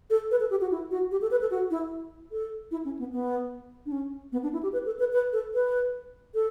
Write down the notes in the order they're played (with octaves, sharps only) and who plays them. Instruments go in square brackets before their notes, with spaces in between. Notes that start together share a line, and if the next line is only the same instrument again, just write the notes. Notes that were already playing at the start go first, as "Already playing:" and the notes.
[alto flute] A4
B4
A4
G4
F#4
E4
F#4
G4
A4
B4
A4
F#4
E4
A4
E4
C#4
B3
B3
D4
C#4
B3
D4
E4
G4
B4
A4
B4
B4
A4
B4
A4